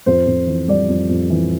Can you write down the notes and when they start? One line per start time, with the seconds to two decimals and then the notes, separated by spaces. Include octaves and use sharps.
0.06 F2 C5
0.27 F2
0.47 E3
0.68 G3 D5
0.89 F2
1.09 F2
1.30 E3